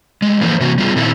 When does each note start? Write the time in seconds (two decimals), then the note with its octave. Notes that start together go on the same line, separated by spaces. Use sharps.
0.22 G#3 A3
0.41 E3 F3 A#3 A4 C5
0.60 C3 E3 A#3 F#4
0.78 G3 B3 F4 G#4
0.96 A#2 D#3 C4 E4 A4